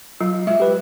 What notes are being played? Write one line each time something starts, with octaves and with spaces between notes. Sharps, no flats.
F#3 F4
G#3 F4 E5
G4 B4